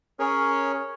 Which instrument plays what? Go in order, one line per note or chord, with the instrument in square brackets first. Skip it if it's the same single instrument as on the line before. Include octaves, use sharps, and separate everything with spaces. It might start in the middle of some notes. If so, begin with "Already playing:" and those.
[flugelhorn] C#4 [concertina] G#4 A#4 C#5